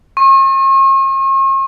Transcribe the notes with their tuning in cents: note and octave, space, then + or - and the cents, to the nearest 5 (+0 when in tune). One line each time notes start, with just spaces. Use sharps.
C#6 -45